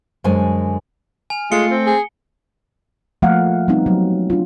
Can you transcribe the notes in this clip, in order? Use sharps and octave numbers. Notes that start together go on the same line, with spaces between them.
F#2 D3 G#3 C5 G#5
G#5 F6
G#3 A3 F4 C#7 G7
C4
G#4
F3 A3 A#3 F5 F#5
G3 B3 C4 D#4
F#3
D4 F4